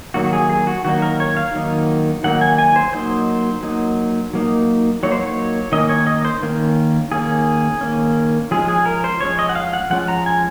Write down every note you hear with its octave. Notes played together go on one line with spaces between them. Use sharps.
D#3 F#3 A#3 D#4 F#4
F#4
G#4
G#4
F#4
D#3 F#3 A#3 D#4 F#4
A#4
C#5
F5
D#3 F#3 A#3 D#4
D#3 F#3 A#3 D#4 F#5
G#5
G#5
C5
F#3 A#3 D#4 C5
F#3 A#3 D#4
F#3 A#3 D#4
F#3 A#3 D#4 C#5
C5
C#5
D#3 A#3 C#4 D#5
C#5
D#5
C5
D#3 A#3 C#4
D#3 A#3 C#4 G#4
D#3 A#3 C#4
F3 G#3 C#4 G#4
G#4
A#4
C5
F3 G#3 C#4 C#5
D#5
F#5
F5
F#5
F3 G#3 C#4 F#5
A#5
G#5